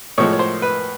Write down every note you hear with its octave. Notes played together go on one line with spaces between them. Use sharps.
A2 F3 G#3 C#5
C#5
C5
B4